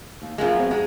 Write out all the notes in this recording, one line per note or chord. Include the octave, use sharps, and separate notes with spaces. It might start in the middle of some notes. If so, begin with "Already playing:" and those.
D#2
F#2 F3 G#3 A#3 F4
B3 C4
F2 G#3 D#4